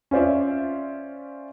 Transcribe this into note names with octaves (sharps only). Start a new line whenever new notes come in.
C#4 F4 C5 D5 E5